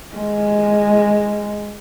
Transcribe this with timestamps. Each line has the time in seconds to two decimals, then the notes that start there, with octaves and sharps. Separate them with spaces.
0.15 G#3